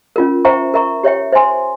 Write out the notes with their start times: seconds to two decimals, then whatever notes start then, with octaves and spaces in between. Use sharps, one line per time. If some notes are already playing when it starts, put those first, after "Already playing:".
0.16 C#4 F4 A#4
0.45 C5 E5 G5 A#5 C#6
0.74 A#4 E5 A#5 C#6
1.03 G4 C#5 E5 G5
1.32 C5 E5 G#5 C6